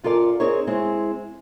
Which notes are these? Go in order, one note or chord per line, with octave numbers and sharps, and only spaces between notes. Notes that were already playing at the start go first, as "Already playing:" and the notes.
F#2 F4 A4 A#4 D5
C4 D#4 G#4 A#4 C5 C#5
G#3 C4 E4